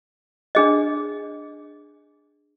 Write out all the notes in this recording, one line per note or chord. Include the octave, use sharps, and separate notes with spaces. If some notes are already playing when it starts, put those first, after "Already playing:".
D4 G#4 D#5